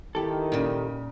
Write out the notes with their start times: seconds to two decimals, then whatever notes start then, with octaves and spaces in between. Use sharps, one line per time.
0.15 D#3 E4 G4 A4
0.52 A#2 C#3